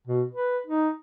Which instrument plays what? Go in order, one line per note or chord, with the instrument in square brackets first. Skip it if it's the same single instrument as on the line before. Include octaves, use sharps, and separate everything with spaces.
[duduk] B2
B4
D#4